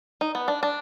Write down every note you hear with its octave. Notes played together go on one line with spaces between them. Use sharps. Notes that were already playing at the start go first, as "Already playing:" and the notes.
D#4
B3
D4
D4